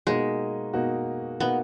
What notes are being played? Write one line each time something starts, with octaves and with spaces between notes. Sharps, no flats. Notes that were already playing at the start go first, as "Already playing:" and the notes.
B2 G#3 A#3 D#4 F#4
B2 A#3 D#4 F#4
B2 A#3 B3 D#4 F#4